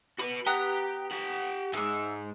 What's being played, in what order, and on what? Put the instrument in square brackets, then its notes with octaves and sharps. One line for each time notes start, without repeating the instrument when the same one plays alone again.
[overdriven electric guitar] F#4 B4 [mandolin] B5
[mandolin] B3 A#5 F#6 [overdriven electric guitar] G4 G5
[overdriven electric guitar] G4 F#5
[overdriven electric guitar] G#2 G#3 [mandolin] E5 E6